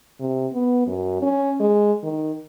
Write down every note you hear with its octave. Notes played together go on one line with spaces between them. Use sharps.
C3
B3
F#2
C#4
G#3
D#3